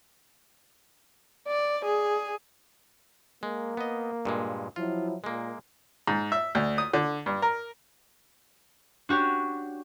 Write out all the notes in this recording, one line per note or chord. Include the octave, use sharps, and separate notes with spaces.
D5
G#4
G#3 A#3
B3 D#5
G2 A#2 G#3
F3 F#3 E4 F4
A#2 G#3 A#3 A#4
G#2
E5
D2
D#6
D3
G2
A#4
D4 F#4 G4 C#5